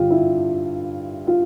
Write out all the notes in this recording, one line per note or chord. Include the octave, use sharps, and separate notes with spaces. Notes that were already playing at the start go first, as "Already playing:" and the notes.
Already playing: G2 D3 F4 G4
E4
F4